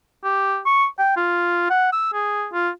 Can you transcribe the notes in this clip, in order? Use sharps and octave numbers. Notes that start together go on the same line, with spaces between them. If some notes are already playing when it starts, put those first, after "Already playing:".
G4
C#6
G5
F4
F#5
E6
G#4
F4